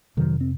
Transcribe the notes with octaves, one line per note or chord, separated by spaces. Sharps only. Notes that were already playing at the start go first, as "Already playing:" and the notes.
F2 C3 D#3 F#3
C4